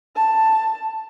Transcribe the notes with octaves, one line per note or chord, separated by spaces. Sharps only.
A5